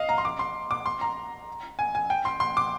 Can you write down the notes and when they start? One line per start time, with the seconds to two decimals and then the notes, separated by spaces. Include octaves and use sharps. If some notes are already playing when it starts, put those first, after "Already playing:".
Already playing: D#5 F5
0.09 A#5
0.18 C6
0.25 D6
0.39 C6
0.71 D6
0.86 C6
1.01 A#5
1.79 G#5
1.95 G#5
2.10 G5
2.25 C6
2.40 C6
2.57 D6